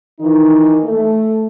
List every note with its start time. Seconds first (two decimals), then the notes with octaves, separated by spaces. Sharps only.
0.20 D#3 E3 D#4
0.84 A3